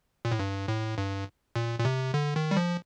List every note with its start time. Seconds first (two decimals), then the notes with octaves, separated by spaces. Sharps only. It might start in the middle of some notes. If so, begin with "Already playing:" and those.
0.25 A#2
0.32 A2
0.39 G2
0.68 A2
0.98 G2
1.56 A#2
1.79 A#2
1.85 C3
2.14 D3
2.36 D#3
2.51 G3
2.57 F3